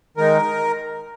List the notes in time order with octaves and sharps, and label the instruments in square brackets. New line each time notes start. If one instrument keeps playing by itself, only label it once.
[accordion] D#3 G#3 D#4 A#4